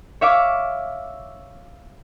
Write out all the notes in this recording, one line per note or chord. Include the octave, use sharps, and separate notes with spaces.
C#5 E5 F5 D6